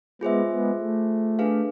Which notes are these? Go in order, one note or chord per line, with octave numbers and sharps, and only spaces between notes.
G#3 B3 F4 G#4 C5 E5
G#3 B3
A3
D4 G#4 B4 F5